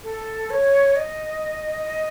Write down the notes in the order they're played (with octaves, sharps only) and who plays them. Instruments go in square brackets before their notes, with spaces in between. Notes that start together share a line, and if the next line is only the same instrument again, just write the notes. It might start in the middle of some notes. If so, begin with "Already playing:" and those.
[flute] A4
C#5
D#5